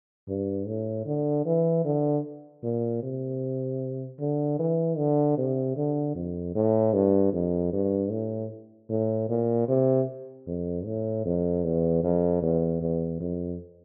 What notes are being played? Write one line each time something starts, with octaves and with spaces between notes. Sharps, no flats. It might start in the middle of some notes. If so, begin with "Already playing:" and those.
G2
A2
D3
E3
D3
A#2
C3
D3
E3
D3
C3
D3
F2
A2
G2
F2
G2
A2
A2
A#2
C3
F2
A2
F2
E2
F2
E2
E2
F2